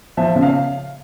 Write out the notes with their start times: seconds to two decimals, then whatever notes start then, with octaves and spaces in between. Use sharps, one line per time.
0.17 F3 E5
0.35 C#3
0.42 F5